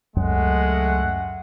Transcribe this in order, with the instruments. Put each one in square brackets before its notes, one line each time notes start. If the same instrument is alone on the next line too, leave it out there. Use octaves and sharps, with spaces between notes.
[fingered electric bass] C#2 F#2 F#3 [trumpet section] G#3 A3 F#5